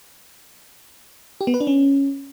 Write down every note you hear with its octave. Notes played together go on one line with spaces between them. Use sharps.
G4
B3
B4
D4
C#4